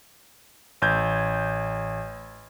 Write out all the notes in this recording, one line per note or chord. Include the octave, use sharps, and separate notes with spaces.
A1 G6 G#6